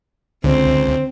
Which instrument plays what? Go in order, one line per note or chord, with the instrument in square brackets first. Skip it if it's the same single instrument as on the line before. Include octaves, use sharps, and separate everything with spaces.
[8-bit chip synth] C#2 [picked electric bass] D3 [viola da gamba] C4 [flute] C5